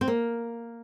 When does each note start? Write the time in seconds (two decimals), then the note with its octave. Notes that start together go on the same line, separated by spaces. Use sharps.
0.01 C4
0.08 A#3